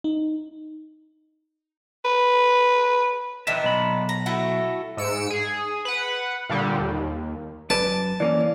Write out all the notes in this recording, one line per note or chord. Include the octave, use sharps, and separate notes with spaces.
D#4
B4
A#2 D#3 D4 B4 E5
B1 B5
A#5
A3 E4 F#4
G#2 E6 C#7 D7
G#4
B4 F#5
A#2 D3 G3
D#2
F#2 B4 D5 A5
E3 A#3 C#4 D5